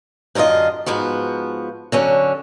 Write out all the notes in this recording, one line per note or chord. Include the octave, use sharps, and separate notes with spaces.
F#2 D3 E4 F4 D#5
G#2 F3 B3 F#4
D3 F#3 C#4